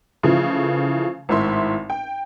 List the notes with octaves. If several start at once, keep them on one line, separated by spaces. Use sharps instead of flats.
C#3 E3 F3 A3
G#1 A2 E5 C6
G5